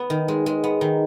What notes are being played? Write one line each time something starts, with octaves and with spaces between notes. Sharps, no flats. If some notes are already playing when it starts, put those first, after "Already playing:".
Already playing: B3
D#3
G#3
G#3
B3
D#3